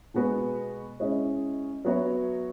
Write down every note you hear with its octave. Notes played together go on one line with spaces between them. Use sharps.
B2 G#3 B3 F#4 B4
G#3 C#4 E4 G#4 D#5
F#3 B3 F#4 C#5 E5